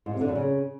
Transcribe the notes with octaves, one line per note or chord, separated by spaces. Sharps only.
G#2
C3
D3
F#2
C#3